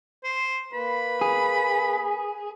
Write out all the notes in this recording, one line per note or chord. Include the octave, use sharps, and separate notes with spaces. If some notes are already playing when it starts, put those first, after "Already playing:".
C5
A#3 B4 B5
G#4